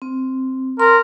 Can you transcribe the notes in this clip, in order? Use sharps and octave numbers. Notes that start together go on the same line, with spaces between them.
C4
A#4 C6